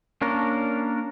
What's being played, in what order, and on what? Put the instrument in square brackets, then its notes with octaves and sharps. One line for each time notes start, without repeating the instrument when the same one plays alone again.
[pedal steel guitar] A#3 C#4 D4 A#4